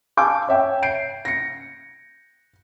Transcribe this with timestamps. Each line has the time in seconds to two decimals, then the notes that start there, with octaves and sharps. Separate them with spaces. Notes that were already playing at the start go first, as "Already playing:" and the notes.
0.17 F5 G#5 A5 D6 G6
0.49 C#5 E5 G5
0.82 G6 C7 D7
1.25 A#6 C#7